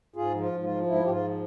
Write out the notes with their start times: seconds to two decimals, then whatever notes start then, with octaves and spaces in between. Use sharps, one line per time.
0.16 G#2 F4 G#4
0.34 F3
0.40 F4
0.52 G#2
0.63 F4
0.69 F3
0.86 G#2 E4
1.04 G#2 G4
1.10 F4
1.21 F3